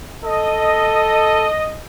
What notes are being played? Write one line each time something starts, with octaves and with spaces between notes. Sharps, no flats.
A4 D#5